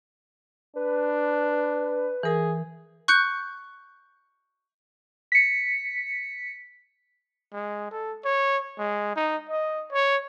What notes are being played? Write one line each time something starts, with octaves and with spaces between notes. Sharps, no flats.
D4 B4
E3 G#4 A#4
C#6 F#6 G6 C#7
B6 C#7
G#3
A4
C#5
G#3
D#4
D#5
C#5